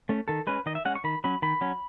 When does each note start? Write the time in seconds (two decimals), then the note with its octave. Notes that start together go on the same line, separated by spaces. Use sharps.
0.09 A3 C#4
0.28 D#3 A4
0.47 G#3 C#4 B4
0.66 D#3 D#5
0.75 E5
0.85 G#3 C#4 F#5
0.95 C#6
1.04 D#3 B5
1.24 F#3 C#4 B5
1.42 D#3 B5
1.61 F#3 C#4